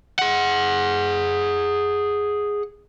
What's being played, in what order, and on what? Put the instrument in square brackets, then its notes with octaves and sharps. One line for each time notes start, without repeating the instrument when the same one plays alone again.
[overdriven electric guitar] G#4 F#5